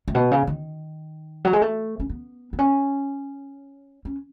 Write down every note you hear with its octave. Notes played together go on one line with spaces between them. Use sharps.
A2
B2
C#3
D#3
F#3
G#3
A3
C#4
B3
B3
C#4
C#4